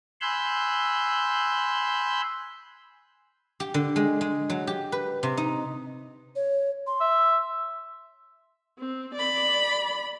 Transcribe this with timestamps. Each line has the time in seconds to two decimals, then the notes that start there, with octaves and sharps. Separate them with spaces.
0.21 G#5 B5 C6 E6 F#6 G6
3.60 G4
3.74 D3
3.96 G#3
4.21 G#3
4.50 F#3
4.67 G4
4.92 B4
5.23 C3
5.37 D#4
6.36 C#5
6.87 C6
7.01 E5
8.78 C4
9.14 D5 B5